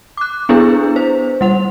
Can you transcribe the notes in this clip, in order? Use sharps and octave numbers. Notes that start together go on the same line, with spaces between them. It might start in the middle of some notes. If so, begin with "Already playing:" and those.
D6 F#6
B3 D4 E4 G#4 B4
C5
G3 F#5 F7